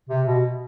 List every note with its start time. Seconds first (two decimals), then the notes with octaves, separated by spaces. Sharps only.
0.09 C3
0.26 B2